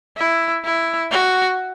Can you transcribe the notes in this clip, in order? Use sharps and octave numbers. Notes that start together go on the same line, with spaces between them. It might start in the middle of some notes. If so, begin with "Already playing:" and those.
E4
E4
F#4